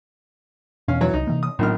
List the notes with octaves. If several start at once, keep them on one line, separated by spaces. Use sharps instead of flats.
E2 B2 C#4 F5
E3 F#3 C#5
C2 D#4
C3 E3 A#3
D#6
A#1 A2 D#3 F#3 B3 F6